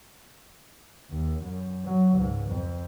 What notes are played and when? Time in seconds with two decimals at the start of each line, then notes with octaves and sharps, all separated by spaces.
1.10 D#2
1.42 F#2
1.85 F#3
2.16 C#2 G#2
2.47 F2